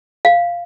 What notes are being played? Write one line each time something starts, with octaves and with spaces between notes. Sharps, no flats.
F5